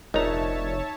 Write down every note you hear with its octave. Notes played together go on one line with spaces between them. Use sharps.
F1 A#1 D#4 C#5 E5 A5 A#5